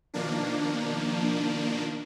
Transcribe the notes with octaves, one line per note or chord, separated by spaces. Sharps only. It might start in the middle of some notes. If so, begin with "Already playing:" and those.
B2 D#3 F3 A#3 D4